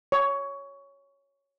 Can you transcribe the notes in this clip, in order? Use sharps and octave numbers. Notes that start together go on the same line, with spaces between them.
C#5